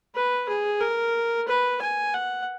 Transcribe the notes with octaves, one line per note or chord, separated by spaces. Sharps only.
B4
G#4
A#4
B4
G#5
F#5